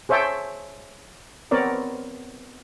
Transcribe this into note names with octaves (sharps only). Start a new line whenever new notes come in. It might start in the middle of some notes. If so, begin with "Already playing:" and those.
G#4 C5 C#5 E5 G5 A5
B3 C4 A#4 C#5 D5